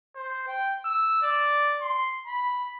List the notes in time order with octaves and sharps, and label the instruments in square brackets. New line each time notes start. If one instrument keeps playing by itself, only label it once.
[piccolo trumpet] C5
G5
E6
D5
C6
B5